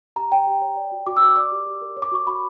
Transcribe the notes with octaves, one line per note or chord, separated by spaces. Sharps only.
G4 A#5
C#5 G5
G4
C#5
D5
F#4
F#4 D6
E6
A#4 D6
D5 D6
G4
G4
A#4
C#5
D6
F#4 C#6
F#4 B5